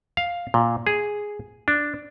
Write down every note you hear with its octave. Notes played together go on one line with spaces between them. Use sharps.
F5
A#2
G#4
D4